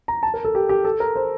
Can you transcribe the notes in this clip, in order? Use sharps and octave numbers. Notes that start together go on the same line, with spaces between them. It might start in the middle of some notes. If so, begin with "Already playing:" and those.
A#5
A5
A#4
A4
G4
G4
A4
A#4
C5